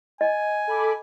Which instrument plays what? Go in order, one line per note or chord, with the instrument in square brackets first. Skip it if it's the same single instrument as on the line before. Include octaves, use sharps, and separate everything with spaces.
[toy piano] D#5 [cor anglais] G#5
[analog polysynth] A4 B5 D6